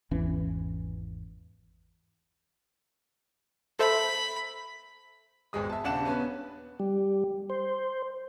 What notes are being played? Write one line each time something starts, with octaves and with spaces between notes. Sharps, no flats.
G#1 E2 E3 C#4
A4 C5 E5 B5
G#1 E2 B2 G#3 D#6
E5 A5
D#1 C#3 D4 F#5 A5 E7
B3 C#4 B4
G3
C5